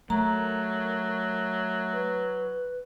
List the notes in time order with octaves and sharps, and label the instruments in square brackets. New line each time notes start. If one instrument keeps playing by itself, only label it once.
[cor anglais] F#3 [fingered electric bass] A3 [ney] A#4 [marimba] A#5
[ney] B4